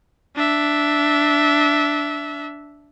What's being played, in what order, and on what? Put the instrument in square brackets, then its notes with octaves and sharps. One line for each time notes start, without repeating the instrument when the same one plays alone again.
[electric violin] D4 E5